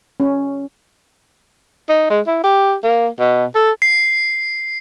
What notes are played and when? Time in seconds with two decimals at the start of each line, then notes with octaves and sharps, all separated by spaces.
0.20 C#4
1.89 D#4
2.10 G#3
2.27 E4
2.44 G4
2.83 A#3
3.19 B2
3.55 A4
3.82 C7